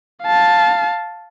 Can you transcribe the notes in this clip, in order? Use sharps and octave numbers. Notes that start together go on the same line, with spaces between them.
F5 A5